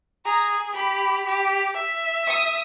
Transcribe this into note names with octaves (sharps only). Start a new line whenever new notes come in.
G#4 A#5
G4 B5
G4
E5
D#6